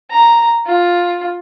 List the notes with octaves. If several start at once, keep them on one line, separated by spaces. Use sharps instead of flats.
A#5
F4